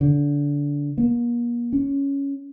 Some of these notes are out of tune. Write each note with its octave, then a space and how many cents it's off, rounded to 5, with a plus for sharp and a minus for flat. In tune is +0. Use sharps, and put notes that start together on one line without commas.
D3 -25
A#3 +40
C#4 +5